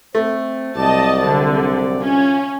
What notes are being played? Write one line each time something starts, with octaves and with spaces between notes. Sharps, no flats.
A3 C4
C2 F#3 C4 D5 D#5 A5
D3
C#4 F4